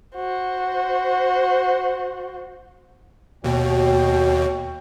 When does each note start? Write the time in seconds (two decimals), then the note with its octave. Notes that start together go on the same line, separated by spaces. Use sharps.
0.16 F#4 C5
3.44 D#2 B2 F#4 C#5 G5